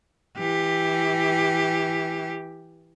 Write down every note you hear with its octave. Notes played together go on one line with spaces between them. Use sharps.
E3 G4